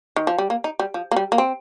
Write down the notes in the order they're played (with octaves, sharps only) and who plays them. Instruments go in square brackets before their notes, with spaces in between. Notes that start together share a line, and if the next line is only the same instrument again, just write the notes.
[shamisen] D#3
F3
G3
A#3
D#4
G3
F3
A#3
G3
A#3
C4